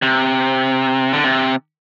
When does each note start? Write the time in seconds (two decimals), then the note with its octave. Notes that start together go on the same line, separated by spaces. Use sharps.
0.02 C3
1.13 D3
1.24 C3